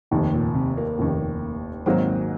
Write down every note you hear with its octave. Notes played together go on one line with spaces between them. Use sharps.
F1 D#2 C3 D#3
A#2
C3
A#3
F1 D#2 D#3
G#1 G#2 F#3 A#3 C4